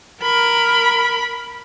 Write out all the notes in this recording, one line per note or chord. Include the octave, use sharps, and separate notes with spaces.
A#4 B5